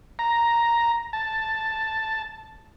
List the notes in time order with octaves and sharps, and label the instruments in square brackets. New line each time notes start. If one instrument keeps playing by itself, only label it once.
[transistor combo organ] A#5
A5